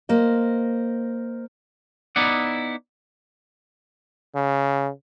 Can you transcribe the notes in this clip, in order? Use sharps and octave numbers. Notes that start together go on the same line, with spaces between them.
A#3 C5 D#5
B3 D#4 E4 D5 F#5
C#3